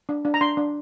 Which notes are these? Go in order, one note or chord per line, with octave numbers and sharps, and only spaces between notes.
D4
D4
A#5
D4 C6
D4